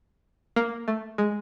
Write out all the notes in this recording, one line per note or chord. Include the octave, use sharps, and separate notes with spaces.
A#3
A3
G#3